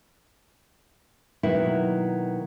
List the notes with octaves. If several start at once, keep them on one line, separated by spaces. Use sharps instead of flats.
B2 D#3 F#3 A#3 E4 F#4